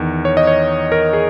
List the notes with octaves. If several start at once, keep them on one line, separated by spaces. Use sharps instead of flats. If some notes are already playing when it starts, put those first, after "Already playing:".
Already playing: E2 D#3
C#5
D#5
C#5
A#4
G#4